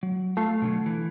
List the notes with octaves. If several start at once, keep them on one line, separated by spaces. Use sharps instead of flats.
F#3
A3 F4 F5
B2 D3 F#3
E3